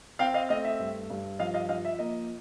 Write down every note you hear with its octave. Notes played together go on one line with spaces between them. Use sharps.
C4 F5 G5
D#5 F5
A3 D#5 F5
E5
G2
G2
F3 D#5 F5
D#5 F5
F3 D#5 F5
E5
A#3 D#5